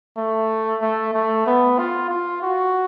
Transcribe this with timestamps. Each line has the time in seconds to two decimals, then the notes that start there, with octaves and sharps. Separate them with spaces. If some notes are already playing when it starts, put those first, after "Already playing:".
0.17 A3
0.82 A3
1.14 A3
1.46 B3
1.79 F4
2.09 F4
2.42 F#4